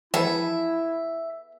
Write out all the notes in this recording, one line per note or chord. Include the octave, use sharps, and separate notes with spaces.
E3 F3 B3 E4 G#4 A4 E5